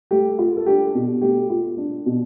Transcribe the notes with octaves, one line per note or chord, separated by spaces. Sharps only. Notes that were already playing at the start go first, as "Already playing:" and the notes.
A3 G4
F4
A4
D4 G4
B2
A3 G4
F4
D4
B2